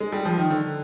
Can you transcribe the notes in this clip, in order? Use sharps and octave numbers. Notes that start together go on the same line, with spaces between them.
G#3
G3
F3
D#3
D3